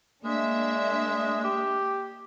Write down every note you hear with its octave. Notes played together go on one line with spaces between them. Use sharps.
G#3 A#3 D4 E5
G4